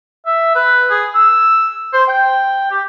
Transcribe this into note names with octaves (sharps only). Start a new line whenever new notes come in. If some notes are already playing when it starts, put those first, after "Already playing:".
E5
B4
G#4
E6
C5
G5
G4